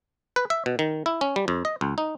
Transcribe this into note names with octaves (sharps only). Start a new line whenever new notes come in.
B4
E5
B2
D#3
E4
C#4
G3
F2
D#5
C#2
D#4